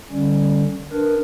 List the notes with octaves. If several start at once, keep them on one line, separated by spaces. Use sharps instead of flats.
D3 G3 C#4
D4 A#4 B4